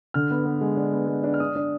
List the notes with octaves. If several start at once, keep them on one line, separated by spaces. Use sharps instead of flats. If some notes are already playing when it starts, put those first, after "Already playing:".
D3 F6
B3
B3
G#3
D4
B3
G#3
D4
F6
D4 D#6
D4